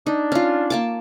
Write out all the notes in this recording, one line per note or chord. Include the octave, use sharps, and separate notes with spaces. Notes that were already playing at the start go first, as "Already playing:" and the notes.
D4 D#4
C#4 F4
A#3 A5 D6